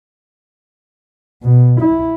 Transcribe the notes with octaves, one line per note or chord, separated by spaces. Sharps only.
B2
E4